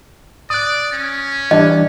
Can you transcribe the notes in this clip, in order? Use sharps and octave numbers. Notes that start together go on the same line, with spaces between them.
D5 D#6 F#6
C#4
E3 G3 D4 D#5